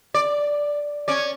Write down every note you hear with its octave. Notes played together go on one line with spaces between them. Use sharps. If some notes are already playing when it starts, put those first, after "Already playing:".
D5
C#4 D5